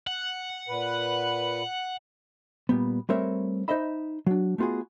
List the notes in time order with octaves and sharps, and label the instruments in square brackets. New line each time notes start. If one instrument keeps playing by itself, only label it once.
[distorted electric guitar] F#5
[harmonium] A#2 B4
[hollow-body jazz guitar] A#2 G3 B3
G3 A3 C4 A#4 C#5 E5
D#4 F4 C5 D#5 E5 B5
F#3 D4
A3 B3 F4 F#4 G#4